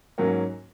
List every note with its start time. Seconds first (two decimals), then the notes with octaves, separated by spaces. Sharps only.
0.18 G#2 F#3 A#3 C#4